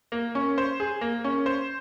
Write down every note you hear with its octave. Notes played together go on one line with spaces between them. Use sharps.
A#3
C#4
C5
G#4
A#3
C#4
C5